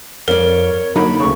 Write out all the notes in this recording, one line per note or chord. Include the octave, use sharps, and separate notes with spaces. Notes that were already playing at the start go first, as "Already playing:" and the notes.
F2 A#4 C#5 D5
D3 F#3 A#3 D#4 B5
D2 C#3 C#6